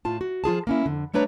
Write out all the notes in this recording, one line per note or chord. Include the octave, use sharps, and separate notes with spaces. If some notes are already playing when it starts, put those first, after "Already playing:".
A2 F4 A5
F#4
F3 F4 G#4 A5
A#3 C#4 E4
F2 D3
G3 A3 D4 B4 C#5 A#5